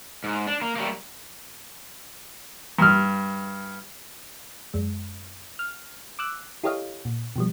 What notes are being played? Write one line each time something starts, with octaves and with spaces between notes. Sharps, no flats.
G#2
D4
A#3
G3 A3 A#3
G2 F6
F#2 G#3
F6
D6 E6 F#6
E4 G4 A4 C#5 D#5 F5
A#2
B2 F3 G3